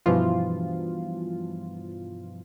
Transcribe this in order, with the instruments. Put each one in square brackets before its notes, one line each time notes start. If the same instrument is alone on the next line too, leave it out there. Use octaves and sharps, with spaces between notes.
[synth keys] G2 B2 E3 F3 F4